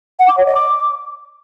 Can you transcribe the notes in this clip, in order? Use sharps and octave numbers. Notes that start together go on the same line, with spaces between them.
F#5
D6
C#5
D#5
D6